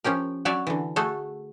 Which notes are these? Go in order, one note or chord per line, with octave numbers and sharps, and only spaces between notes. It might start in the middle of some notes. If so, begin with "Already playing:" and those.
F3 C#4 G4 A#4
F#3 C#4 F#4 C#5 D5 E5
D3 E3
A3 F#4 G#4 A4